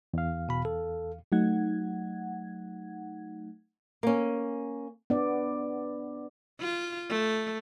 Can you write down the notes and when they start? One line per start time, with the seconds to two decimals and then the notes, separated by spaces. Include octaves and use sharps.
0.14 E2 F5
0.49 B2 B5
0.65 A4
1.32 F#3 A3 D#4 F#5 G#6
4.03 A#3 C#4
5.10 B3 D4 D5
6.60 F4
7.09 A3